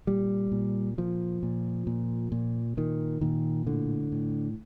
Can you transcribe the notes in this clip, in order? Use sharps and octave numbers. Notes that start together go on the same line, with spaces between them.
A#2 G3
A#2
A#2 F3
A#2
A#2
A#2
A#2 D#3
A#2 D#3
A2 D3
A2